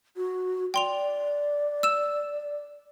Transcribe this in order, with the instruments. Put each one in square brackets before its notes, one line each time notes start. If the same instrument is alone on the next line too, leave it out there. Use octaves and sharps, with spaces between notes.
[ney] F#4
[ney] D5 [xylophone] G5 C6 F7
[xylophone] E6 E7